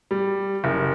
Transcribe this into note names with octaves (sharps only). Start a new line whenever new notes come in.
G3
F#1